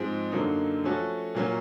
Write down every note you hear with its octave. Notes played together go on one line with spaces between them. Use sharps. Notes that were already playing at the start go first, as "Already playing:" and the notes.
Already playing: G#2 F3 G#3 C4
F#2 D3 F#3 A#3 D#4
F3 A3 C#4 F#4 A4
A#2 F#3 A#3 C#4